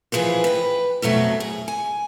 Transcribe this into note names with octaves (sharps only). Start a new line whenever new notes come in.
E3 F3 G#4 B4 C5
B4 G5
F2 B2 F#3 A3
G#4
G#5